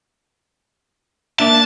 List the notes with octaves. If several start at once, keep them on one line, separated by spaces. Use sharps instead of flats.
A#3 D4 E5 A5